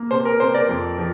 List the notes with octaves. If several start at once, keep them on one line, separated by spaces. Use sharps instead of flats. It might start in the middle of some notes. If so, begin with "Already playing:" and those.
Already playing: A#3
C3 C5
A#4
C3 C5
A#4 D5
F2
F3